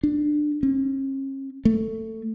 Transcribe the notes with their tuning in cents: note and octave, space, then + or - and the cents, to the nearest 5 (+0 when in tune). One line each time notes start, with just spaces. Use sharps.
D4 +20
C#4 -45
A3 +15